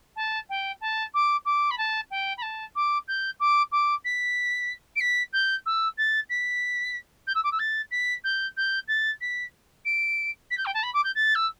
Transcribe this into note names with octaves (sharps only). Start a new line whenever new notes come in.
A5
G5
A5
D6
D6
B5
A5
G5
B5
A5
D6
G6
D6
D6
B6
D7
B6
G6
E6
A6
B6
G6
E6
D6
E6
A6
B6
G6
G6
A6
B6
D7
B6
G6
G5
A5
B5
D6
G6
A6
E6